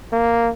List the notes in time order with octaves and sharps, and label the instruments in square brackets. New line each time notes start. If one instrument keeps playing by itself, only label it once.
[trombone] A#3